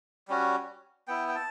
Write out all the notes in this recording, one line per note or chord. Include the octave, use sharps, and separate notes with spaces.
G3 C#4 F#4
B3 E4 G5
G5
A5